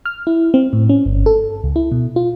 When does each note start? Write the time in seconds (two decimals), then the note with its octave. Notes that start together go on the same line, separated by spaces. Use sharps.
0.06 F6
0.27 E4
0.54 C4
0.73 A2
0.89 C#4
1.06 G1
1.26 A4
1.64 C#2
1.76 E4
1.92 B2
2.16 F4